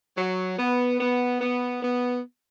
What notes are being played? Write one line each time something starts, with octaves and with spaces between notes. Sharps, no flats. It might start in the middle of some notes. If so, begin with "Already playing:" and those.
F#3
B3
B3
B3
B3